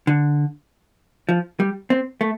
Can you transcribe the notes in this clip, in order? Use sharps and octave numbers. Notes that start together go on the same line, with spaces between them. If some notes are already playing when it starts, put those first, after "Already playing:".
D3
F3
G3
C4
A3